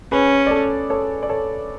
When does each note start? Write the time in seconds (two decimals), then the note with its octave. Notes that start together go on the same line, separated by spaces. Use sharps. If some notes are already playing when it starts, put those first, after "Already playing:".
0.12 C#4 G#4 B4
0.47 D5
0.51 A4 C#5
0.90 A4 C#5
1.23 D5
1.29 A4 C#5